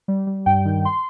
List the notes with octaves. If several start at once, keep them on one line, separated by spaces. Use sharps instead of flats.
G3
G3
G2 G5
D#3
C6